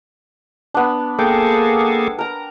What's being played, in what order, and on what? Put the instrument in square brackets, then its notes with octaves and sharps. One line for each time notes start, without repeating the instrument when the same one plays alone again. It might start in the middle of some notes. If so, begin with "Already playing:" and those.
[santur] B3 D4
[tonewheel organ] A#3 G#4 A4 [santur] G5
[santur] A#4 A#5